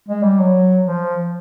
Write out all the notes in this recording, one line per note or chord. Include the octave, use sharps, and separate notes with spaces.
G#3
G3
F#3
F3